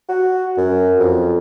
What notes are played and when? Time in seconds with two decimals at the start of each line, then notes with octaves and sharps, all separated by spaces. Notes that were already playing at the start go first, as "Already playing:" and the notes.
0.09 F#4
0.57 F#2
1.00 F2